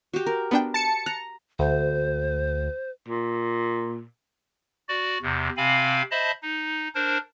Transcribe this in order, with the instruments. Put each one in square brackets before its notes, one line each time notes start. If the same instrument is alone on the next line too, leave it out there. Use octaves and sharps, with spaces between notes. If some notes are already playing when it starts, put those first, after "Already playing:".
[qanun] F#4 G4
A#4
[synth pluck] B3 D4 G5
[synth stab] A5 C#7
[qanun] A#5 [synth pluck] F#6
[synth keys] D2 [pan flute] C5
[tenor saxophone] A#2
[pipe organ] F#4 D5
E2 C3
C3 C4 F5 G#5 B5
C5 D#5 E5 A5 B5
D#4
D4 A#4 C5